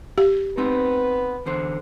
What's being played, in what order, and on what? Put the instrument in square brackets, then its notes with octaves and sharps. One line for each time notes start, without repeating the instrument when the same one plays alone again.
[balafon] G4
[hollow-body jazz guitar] B3 C4 D#4 [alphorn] B4
[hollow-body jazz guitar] E2 D3 C5